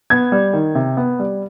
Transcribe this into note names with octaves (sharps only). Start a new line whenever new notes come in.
B3 G#6
G3
D#3
C3
B3
G3